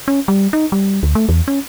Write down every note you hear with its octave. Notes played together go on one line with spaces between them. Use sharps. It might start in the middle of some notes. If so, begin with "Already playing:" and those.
C#4
G3
D#4
G3
D2
A3
E2
C#4